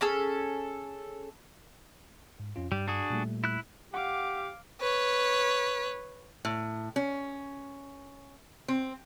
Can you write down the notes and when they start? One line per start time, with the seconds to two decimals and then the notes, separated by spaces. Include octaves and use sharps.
0.01 C#4 G#4 A4 E6
2.40 G#2
2.56 F2 C#4 F4
2.72 G2 G3
2.88 D4 F#4 G#4
3.10 A#2 G3 A3
3.44 E4 F#6
3.94 G4 F5 F#5 D6
4.81 B4 C#5
6.45 A2
6.96 C#4
8.68 C4